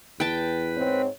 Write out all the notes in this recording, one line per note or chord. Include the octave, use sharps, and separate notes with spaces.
E2 B4 G5 A5
G#2 C4 C#5